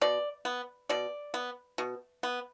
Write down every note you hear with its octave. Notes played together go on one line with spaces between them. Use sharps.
B2 D5
B3
B2 D5
B3
B2
B3